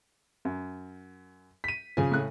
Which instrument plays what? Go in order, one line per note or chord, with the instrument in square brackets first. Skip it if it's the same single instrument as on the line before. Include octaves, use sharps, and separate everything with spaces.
[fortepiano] F#2
[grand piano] B6 D#7
[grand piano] C#3 G#5 [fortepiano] F3
[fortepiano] A2 F#6